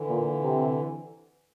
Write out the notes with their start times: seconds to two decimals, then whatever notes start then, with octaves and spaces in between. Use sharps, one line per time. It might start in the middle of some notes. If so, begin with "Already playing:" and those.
Already playing: D3 E3
0.08 A#2
0.43 C3